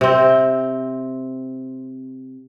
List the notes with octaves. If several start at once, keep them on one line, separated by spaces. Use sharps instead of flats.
C3 C4